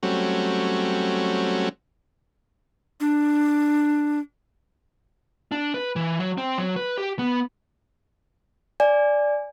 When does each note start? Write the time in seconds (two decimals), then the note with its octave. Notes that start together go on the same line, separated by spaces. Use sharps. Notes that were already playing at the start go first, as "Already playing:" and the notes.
0.03 F#3 G3 A3 C4 C#4 F#4
3.00 D4
5.52 D4
5.74 B4
5.96 E3
6.20 F#3
6.38 C4
6.58 F#3
6.76 B4
6.98 G4
7.19 B3
8.80 D5 G#5